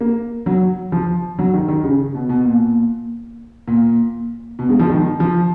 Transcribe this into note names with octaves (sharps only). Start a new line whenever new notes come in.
A#3
F#3
F3
F#3
D#3
D#3
C#3
B2
B2
A#2
A#2
B2
G#3
F3
D#3
F3